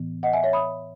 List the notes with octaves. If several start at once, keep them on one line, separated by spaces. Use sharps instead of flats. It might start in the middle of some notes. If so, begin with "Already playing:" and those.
Already playing: A2 E3 B3
D#5 F#5
E5 G#5
C#5 E5
B5 D#6